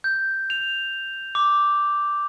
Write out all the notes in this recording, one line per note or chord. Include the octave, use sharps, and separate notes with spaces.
G6
F7
D6